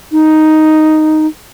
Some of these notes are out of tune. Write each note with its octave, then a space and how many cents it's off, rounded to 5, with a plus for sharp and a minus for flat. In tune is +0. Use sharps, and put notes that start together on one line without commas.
D#4 +0